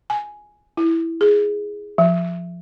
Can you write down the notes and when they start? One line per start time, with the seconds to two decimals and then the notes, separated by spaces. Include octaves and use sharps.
0.10 G#5
0.77 E4
1.21 G#4
1.98 F3